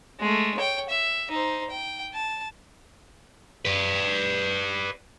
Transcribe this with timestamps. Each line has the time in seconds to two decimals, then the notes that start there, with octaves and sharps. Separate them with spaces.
0.20 G#3 A3
0.57 C#5 G5
0.89 E5
1.31 D#4 C5
1.70 G5
2.14 A5
3.65 B4 D5